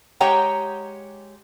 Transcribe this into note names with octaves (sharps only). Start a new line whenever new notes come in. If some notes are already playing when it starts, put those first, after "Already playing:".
G#3 G4 C#5 F#5 G5 A#5